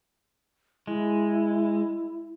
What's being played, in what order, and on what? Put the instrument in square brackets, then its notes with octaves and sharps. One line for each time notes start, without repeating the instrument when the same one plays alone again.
[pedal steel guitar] G#3 [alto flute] E4